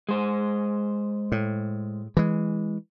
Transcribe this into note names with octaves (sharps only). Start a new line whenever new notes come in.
G#3 C5
A2
E3 G#3